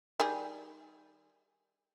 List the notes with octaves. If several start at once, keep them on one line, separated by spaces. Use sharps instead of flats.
D#3 G3 G#4